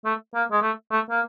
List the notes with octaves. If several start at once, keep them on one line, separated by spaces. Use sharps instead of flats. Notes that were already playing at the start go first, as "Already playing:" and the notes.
A3
A#3
G#3
A3
A3
A#3